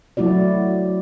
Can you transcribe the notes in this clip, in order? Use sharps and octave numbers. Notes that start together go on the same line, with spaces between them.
F#3 A3 E4 F#4 D5